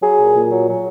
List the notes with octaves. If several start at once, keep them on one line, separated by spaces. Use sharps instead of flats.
F#3 G#4
A#2
A#2
F#3
F#3